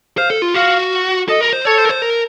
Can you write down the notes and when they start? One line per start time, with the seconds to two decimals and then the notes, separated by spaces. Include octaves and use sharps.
0.17 C5 F5
0.30 A4
0.42 F4
0.54 F#4 F5
1.28 A4 D#5
1.41 A#4
1.53 C5
1.65 A4 C#5
1.78 C5
1.85 A#4
1.89 C5
2.02 A#4